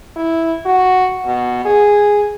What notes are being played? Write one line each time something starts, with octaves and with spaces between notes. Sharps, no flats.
E4
F#4
B2
G#4